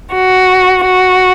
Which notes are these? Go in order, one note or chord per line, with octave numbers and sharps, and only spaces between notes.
F#4
F#4